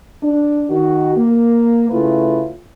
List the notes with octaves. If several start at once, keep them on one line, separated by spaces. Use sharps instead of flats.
D4
D#3 F#4
A#3
C#3 A3 E4 F4 B4